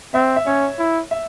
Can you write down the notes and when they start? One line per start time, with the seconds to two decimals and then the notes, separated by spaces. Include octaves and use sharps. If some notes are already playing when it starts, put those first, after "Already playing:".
0.14 C4 E5
0.36 E5
0.46 C#4 C#5
0.79 E4
1.11 E5